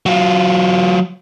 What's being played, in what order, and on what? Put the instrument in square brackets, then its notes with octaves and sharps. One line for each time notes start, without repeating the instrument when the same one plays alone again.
[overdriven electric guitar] F#3 F4